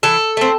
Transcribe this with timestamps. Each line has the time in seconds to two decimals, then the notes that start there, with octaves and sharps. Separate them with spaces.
0.03 E3 A4
0.37 A3 C4